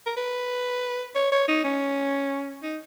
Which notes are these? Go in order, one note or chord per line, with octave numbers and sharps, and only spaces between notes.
A#4
B4
C#5
C#5
D#4
C#4
D#4